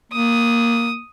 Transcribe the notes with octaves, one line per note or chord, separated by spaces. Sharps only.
A#3 D#6